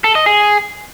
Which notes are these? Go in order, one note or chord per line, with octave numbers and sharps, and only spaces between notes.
A4
D#5
G#4